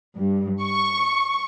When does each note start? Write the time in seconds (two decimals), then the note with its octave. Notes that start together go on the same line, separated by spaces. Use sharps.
0.16 G2
0.63 C#6